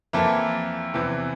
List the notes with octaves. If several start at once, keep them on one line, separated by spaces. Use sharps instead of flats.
F2 E3 A#3 E4 A4
E2 C3 E3